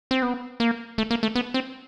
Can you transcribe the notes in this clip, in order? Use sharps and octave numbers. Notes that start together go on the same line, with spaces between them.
C4
B3
A#3
A3
A#3
A3
B3
C4